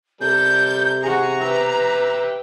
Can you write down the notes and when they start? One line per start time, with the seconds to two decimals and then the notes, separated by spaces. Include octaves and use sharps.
0.21 C3 G3 A4 A#4 G6
1.02 F#4 G#4 A#5
1.41 G4 B4 E5 G5